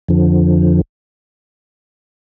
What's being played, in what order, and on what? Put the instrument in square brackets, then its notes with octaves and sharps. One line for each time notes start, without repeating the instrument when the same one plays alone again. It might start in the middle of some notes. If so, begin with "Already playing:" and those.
[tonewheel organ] F2 D3 F3